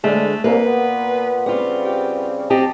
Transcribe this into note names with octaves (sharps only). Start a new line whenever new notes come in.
D2 A2 D3 G#3 A3 D4 G#4
C2 A#3 B4
A#2 B3
C#3 G3 B3 C4 F4
G4
F#3 C4 G4 D#5 A5